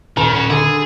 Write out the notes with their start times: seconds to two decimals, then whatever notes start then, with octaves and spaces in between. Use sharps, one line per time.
0.17 D#1 D#3 A#5
0.33 C#4 F#4
0.50 D3 G#4